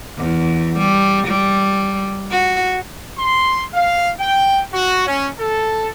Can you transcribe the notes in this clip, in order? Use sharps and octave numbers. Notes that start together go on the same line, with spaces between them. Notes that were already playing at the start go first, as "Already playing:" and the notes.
E2
G3
G3
F#4
C6
F5
G5
F#4
C#4
A4